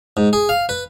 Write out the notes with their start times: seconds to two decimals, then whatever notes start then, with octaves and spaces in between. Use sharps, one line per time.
0.17 G#2
0.33 G#4
0.49 F5
0.69 B4